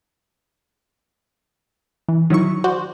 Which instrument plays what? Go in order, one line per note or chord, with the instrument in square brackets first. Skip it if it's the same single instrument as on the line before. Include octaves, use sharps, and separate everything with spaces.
[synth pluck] E3
D#3 F#3 E4 C#6
F#4 C5 D5